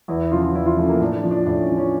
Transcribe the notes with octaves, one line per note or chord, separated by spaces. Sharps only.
E2 E4
C#3 F3 F4
F4
E2 E4
F4
C#3 F3 A3
A#3
A2 D4
D4
F3
D4
A2 D4
C#4
F3
C#4